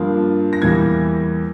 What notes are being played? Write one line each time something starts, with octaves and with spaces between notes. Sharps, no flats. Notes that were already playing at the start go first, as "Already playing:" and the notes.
Already playing: G2 F3 A#3
A#6
E2 E3 G3 A#3 G#6